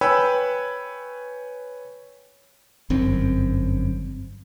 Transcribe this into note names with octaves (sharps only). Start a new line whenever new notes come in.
B4 C#5 G5 G#5 B5 E6
G1 F#2 C4